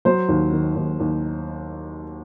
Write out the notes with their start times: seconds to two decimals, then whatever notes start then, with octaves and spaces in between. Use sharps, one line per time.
0.05 F#3 C5
0.29 D#2
0.52 D#3
0.76 D#2
1.00 D#2